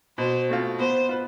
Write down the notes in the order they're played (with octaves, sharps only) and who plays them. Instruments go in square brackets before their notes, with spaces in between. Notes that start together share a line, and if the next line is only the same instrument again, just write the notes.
[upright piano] B2 [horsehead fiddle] C5
[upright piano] A3 C4 F4
[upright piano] B3 [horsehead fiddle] C5
[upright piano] F4 B4